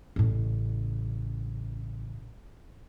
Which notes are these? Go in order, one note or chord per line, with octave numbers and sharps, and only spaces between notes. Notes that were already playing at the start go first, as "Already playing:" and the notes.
A1 C#3